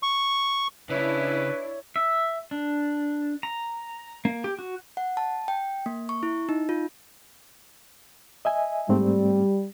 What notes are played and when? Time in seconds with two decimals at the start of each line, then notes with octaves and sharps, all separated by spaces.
0.03 C#6
0.90 C#3 D4 E4 B4 C#5
1.96 E5
2.51 D4
3.43 A#5
4.25 A#3
4.44 G4
4.59 F#4
4.97 F#5
5.17 A5
5.48 G5
5.86 A#3
6.09 C#6
6.23 E4
6.49 D#4
6.69 F4
8.45 D#5 E5 G#5
8.89 G#2 G3 A3 C4